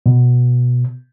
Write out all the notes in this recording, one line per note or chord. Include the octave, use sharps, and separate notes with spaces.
B2